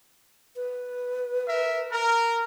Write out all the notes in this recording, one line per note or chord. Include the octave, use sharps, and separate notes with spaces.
B4
A#4 E5
A#4